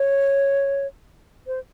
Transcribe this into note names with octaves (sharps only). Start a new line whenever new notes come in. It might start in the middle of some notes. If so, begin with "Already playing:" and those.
Already playing: C#5
C5